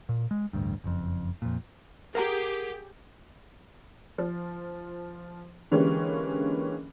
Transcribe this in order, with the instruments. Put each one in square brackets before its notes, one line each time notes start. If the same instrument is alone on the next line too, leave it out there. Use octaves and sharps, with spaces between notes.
[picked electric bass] A#2
G#3
A1 D2 G2
F#1 F2
F2 A#2
[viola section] G4 G#4 [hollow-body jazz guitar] A#4 F#5 A#5
[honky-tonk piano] F3
D3 E3 G#3 A#3 C#4 G4